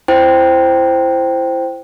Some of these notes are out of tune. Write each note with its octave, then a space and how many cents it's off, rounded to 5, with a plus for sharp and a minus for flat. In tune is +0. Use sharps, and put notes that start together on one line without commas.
E4 +30 C5 +0 G5 -5